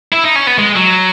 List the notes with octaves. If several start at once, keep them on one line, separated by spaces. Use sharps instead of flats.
E4
D#4
C#4
B3
G#3
F#3